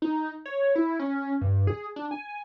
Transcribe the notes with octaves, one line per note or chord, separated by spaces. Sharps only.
D#4
C#5
E4
C#4
G2
G#4
D4
G#5